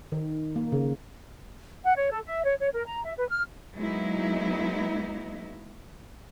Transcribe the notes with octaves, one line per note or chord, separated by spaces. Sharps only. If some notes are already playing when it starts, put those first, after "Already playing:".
D#3
A#3
C#3
F#5
C#5
A4
E5
C#5
C#5
A#4
A#5
E5
B4
F6
F#3 G#3 A#3 B3 D#4 E4